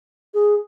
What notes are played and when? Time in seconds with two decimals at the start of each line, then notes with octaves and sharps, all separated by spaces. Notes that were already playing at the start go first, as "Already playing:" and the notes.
0.34 G#4